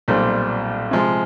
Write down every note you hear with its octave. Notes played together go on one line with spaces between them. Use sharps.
B1 A#2 G3 C4
C3 F3 G#3